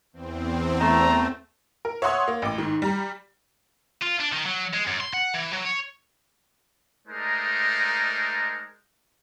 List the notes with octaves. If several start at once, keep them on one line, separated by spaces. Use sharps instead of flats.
E2 C4
A3 A#5
A#4
C#5 E5 F#5 C6 D#6 G#6
A#3
A1 D6
G#2 D#3
G3 A#5
F4
D4
D#3
F#3
G#3
F#2
C6
F#5
E3
F#3
C#5
G#3 A3 D#4 A#4 C5 D5